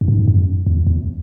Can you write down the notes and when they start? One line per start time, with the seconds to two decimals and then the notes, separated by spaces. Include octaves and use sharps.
0.01 F#2
0.08 G#2
0.28 F#2
0.66 E2
0.87 E2